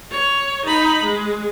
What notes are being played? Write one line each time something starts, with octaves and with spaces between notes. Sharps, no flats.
C#5
D#4 B5
G#3